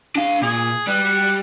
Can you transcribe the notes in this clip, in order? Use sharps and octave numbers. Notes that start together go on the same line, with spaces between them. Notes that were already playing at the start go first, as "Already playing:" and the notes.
D4 F5
A#2 G#4
G3 B4
F#4